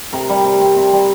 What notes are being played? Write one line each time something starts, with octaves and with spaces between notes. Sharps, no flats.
C3 A#4
G3
C3
C4
C3
G3